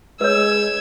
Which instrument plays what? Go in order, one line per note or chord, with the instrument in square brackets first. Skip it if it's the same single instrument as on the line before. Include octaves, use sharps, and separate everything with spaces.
[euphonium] G#3 [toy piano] B4 C#5 [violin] E6 G#6